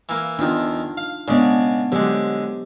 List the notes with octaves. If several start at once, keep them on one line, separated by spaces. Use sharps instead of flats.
E3 A#3
E2 D#3 D4 D#4 F4
F5
C#3 G#3 B3 D4 D5
D3 F#3 G#3 G4 C5